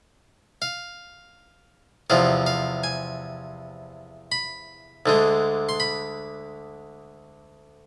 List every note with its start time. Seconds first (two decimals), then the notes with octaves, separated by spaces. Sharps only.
0.62 F5
2.10 E2 C3 F3 F5
2.46 F5
2.84 G#5
4.32 B5
5.06 D2 D3 G#3
5.69 C6
5.80 B5